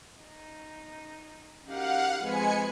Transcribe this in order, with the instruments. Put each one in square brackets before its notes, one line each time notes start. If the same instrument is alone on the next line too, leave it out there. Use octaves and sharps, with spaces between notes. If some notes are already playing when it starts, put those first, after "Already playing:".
[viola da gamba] D#4
[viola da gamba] F#2 D#4 G4 [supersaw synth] F5 F#5
[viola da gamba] F2 G#4 B4 [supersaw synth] G#3 G#5 C#7